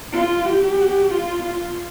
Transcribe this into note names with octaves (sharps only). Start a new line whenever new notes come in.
F4
G4
F4
F4